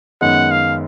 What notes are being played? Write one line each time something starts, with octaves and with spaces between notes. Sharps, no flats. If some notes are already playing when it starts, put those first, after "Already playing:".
F#2 D#3 G#3 B3 F#5
F5